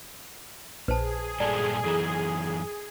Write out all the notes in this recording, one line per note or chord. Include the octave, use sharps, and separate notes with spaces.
A#1 G#4 B4 C5 A5
G2 A#2 A4 D5 A5 A#5
F#2 E3 A4 A#5